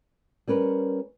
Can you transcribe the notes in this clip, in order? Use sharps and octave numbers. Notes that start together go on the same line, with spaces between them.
G3 C#4 A#4 B4